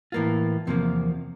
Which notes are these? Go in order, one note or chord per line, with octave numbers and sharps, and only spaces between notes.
A2 E3 A#3 F4
E2 C3 F3 A#3